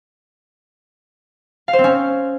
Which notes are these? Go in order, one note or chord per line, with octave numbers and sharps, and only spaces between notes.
F5
C5
C4
C#4